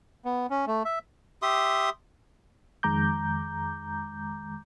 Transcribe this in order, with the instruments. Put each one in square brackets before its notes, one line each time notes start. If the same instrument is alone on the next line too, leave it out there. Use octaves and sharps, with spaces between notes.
[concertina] B3
C#4
A3
E5
[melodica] G4 E5 C6 D#6
[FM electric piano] F2 D#3 G#3 A#5 D6 G6